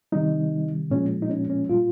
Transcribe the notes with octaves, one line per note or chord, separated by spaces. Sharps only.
C3 D#3 G3 D#4
A#2 F3 G#3 C#4
D#4
C#4
C#4
A#2 G3 F4